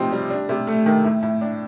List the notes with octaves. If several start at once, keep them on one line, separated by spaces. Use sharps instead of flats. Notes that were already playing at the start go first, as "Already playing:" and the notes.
Already playing: C3 F3 C4 D#4
G3
D4
C3
A3
D#3
A2
A2
D4